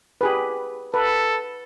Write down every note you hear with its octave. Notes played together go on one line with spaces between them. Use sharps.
G4 G#4 B4
A4 B4